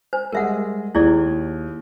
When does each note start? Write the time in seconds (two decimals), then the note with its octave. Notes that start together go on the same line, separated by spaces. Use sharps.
0.13 C5
0.33 G3 G#3 A#4 E5 F#5
0.95 D#2 E4 G#4 D5